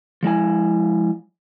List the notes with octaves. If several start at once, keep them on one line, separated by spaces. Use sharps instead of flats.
F3 G#3 E4 G#5